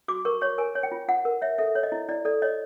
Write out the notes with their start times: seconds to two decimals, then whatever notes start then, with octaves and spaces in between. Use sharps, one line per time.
0.08 F#4 D6
0.25 A#4 C#6
0.41 C#5 C#6
0.58 A#4 G#5
0.75 C#5
0.83 G5
0.92 F4
1.08 F4 F#5
1.25 A#4
1.42 C#5 E5
1.58 A4 E5
1.75 C#5
1.83 D#5
1.92 E4
2.09 E4 D5
2.25 A4 D5
2.42 C#5 D#5